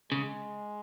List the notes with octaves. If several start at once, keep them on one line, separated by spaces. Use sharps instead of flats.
C#3 G#3